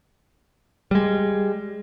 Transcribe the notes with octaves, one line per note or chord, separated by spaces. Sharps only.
G3 G#3